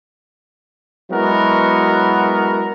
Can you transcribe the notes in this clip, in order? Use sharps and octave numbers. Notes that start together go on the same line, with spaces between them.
F#3 G#3 B3 E4 F#4 A#4